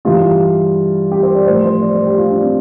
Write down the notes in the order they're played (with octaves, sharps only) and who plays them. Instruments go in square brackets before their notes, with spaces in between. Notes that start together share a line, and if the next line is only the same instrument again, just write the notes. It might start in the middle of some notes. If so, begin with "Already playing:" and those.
[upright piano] G2 E3 G3 F4
G4
C5
D5
A2 F3 C5
C5
D5
C5
G4
F4
D4
C4